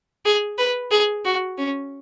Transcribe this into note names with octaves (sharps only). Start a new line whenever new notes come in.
G#4
B4
G#4
F#4
C#4